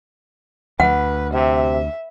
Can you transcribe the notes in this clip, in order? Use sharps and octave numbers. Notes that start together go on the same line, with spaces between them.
D2 B4 F#5
C3 E5